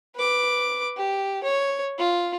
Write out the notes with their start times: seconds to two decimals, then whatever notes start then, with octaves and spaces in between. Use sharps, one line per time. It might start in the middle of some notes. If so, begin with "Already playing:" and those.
0.15 B4 D6
0.97 G4
1.44 C#5
1.99 F4